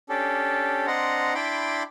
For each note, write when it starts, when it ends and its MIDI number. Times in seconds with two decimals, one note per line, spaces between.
0.09 0.87 61
0.09 0.87 62
0.09 0.87 67
0.09 0.87 69
0.87 1.34 60
0.87 1.34 62
0.87 1.34 75
0.87 1.34 78
0.87 1.34 82
0.87 1.34 84
1.35 1.83 62
1.35 1.83 64
1.35 1.83 79
1.35 1.83 83
1.35 1.83 84
1.35 1.83 86